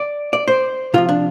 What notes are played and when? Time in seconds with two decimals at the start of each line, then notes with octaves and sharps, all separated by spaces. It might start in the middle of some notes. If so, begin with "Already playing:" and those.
Already playing: D5
0.33 D5
0.48 C5
0.94 C3 F3 F4
1.09 D4